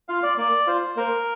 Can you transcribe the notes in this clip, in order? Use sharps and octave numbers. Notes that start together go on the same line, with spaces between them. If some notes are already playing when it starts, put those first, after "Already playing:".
F4 F5
D5
A#3 D5
F4 C5
A#3 A#4